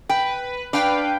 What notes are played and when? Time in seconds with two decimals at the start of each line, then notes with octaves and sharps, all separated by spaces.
0.09 B4 G5
0.73 D4 B4 F5 G5